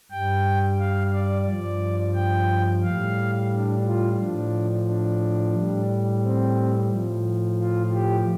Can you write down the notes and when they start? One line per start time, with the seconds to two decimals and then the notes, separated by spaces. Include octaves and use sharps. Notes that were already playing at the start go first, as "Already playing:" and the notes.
0.11 G2 G3 G5
0.79 F5
1.14 D5
1.47 G2 F3 D5
2.15 G5
2.83 A2 G3 F5
3.52 D4
3.85 F4
4.19 A2 F3 D4
4.87 D4
5.55 A2 G3
6.23 C4
6.90 A2 F3
7.59 F4
7.92 G4